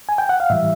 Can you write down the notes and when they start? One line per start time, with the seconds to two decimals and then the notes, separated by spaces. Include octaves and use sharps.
0.09 G#5
0.18 G5
0.29 F#5
0.40 F5
0.50 A2 E3 G3 E5